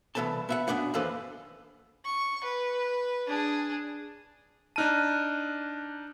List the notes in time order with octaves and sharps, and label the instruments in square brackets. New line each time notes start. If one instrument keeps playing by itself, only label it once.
[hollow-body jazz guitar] C2 E3 B3 A4 A5
B3 E5 F#5
F#2 B3 D4 F#5
D#2 E3 A#3 A4 B4 C5
[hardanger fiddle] C#6
B4
D4 G#4
[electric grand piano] D4 D#4 D#7 [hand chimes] A5 F6 F#6